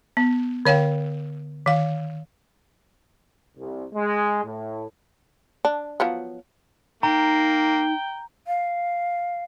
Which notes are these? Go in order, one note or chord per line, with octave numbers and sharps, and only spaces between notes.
B3
D3 C#5 F5 G5
D#3 F5
C2
G#3
A2
D4
F3 F#3 B3
A#3 D#4 G5 A#5
F5